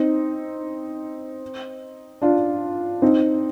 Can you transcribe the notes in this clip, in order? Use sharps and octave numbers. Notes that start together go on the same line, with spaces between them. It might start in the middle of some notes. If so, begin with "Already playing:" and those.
Already playing: C4 D#4
D4 F4
C4 D#4